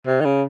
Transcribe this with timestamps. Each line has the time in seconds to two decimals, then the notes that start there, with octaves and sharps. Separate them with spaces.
0.07 C3
0.20 D#3
0.25 C#3